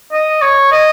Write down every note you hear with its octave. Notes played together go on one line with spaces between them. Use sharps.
D#5
C#5
D#5